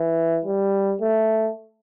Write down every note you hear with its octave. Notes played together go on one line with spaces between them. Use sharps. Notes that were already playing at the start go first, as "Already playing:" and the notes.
Already playing: E3
G3
A3